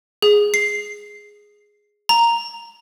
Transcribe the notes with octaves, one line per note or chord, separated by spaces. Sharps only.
G#4
C7
A#5